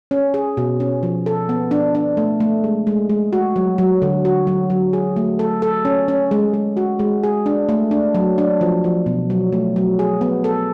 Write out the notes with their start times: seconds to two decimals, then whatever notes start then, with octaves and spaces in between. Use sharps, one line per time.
0.11 C#4
0.34 G#4
0.57 B2
0.80 C#4
1.03 F3
1.26 A4
1.49 B3
1.71 D4
1.95 D4
2.17 A3
2.40 A3
2.64 G#3
2.87 G#3
3.09 G#3
3.33 F#4
3.56 F#3
3.78 F#3
4.02 D3
4.25 F#4
4.47 F#3
4.70 F#3
4.93 G#4
5.16 A3
5.39 A4
5.62 A4
5.85 C#4
6.08 C#4
6.31 G#3
6.54 G#3
6.77 F#4
6.99 G#3
7.23 G#4
7.46 D4
7.69 A3
7.91 D4
8.15 F#3
8.38 D4
8.61 F3
8.84 F3
9.06 B2
9.30 F#3
9.53 A3
9.76 F#3
9.99 G#4
10.21 B3
10.44 A4